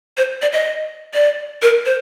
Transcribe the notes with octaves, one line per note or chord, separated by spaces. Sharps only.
C5
D5
D#5
D5
A#4
C5